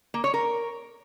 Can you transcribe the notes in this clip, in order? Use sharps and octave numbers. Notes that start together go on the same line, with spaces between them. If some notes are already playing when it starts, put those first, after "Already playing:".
A#3
C#5
A#4